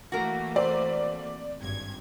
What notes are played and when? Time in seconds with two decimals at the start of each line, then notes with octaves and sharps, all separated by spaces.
0.12 E3 A3 A#3 F#4 A#4
0.56 C4 D5
1.59 G#1 G2 G#6